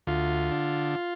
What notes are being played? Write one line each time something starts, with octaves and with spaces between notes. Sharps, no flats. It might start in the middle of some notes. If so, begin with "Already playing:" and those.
D2 F4
D3